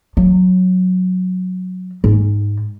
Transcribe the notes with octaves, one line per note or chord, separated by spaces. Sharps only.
F#3
G#2